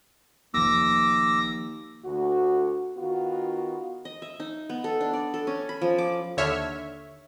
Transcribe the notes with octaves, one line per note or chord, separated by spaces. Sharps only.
F1 D#2 F3 D6 E6 A#6
D2 F#4
D#3 B3 F4 F#4
D#5
E5
D#4
B3
A4
D4
D5
A4
C#4
B5
F3
D6
D#2 D3 C#5 E5 F6